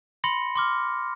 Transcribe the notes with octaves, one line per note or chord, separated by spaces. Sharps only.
B5 C6 A#6 C#7
C6 D6 F6